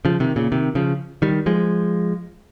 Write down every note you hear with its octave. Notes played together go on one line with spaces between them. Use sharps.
C#3 F3
C3 D#3
A#2 C#3
C3 D#3
C#3 F3
D#3 G3
F3 G#3